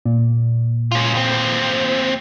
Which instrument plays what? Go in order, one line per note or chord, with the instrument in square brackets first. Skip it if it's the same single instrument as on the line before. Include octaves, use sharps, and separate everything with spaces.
[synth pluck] A#2
[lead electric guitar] C#4 F4
D#2 C4